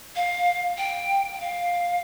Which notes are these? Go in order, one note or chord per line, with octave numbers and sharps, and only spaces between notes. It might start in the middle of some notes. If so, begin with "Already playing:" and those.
F5
G5
G5
F5